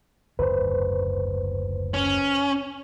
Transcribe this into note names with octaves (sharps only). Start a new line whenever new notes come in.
F#1 D2 G#2 B4 C5
C#4